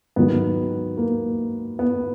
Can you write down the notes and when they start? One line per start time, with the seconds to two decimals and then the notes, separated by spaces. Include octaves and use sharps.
0.16 G#2 D#3 F#3 B3
0.97 A#3
1.79 B3